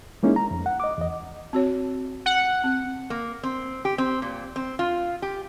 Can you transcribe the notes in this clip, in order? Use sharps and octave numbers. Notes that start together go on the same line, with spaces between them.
G#3 A#3 C#4 D#4 E4 G#4
A#5
F2
F#5
D#5 D6
E2 D#5
C4 F#4 C#5
F#5
C4
A#3
C4
G4
C4
A#2
C4
F4
G4